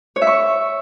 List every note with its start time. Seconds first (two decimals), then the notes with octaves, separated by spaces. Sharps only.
0.16 C#5
0.22 E5
0.27 C#6